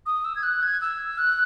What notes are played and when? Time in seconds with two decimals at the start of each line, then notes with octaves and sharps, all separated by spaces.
0.06 D#6
0.25 E6
0.36 G#6
0.43 F#6
0.63 G#6
0.81 E6
1.18 F#6